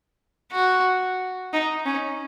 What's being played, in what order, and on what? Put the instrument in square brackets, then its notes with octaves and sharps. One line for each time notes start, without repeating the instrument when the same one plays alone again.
[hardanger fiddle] F#4
D#4
C#4